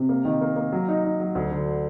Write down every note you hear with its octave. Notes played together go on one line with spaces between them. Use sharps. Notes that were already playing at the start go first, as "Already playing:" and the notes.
Already playing: C3
A#3
D#3
A#3
A#3
F#3
D#4
D#4
F#3
D2
D3